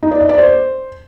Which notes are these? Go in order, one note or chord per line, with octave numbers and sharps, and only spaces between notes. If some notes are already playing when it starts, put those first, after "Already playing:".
D#4
D5
D#5
D5
C5